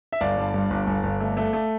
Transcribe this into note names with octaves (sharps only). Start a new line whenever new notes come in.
E5
G1 D5 F5
G2
G2
G1
G1
G1
A3
A3
A3